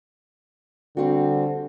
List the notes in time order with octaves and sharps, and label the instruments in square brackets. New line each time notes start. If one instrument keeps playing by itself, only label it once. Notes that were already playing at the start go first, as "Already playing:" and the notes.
[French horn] D3 [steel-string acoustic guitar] G3 C4 F#4